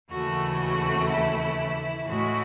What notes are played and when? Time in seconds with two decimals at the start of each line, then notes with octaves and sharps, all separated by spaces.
0.11 D#2 C#3 E3 A3 F#4
0.60 F#4
1.10 E4
2.07 A2 G#3 F#4